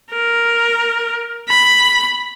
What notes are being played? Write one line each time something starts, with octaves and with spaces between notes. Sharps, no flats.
A#4
B5